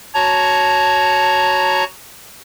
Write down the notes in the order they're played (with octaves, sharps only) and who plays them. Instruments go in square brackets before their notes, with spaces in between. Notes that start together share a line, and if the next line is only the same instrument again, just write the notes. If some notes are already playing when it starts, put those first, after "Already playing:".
[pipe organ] F#4 C#5 A#5 [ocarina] A5